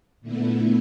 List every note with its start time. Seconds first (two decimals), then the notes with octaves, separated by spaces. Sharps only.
0.21 A#2 D3 A3 B3 E4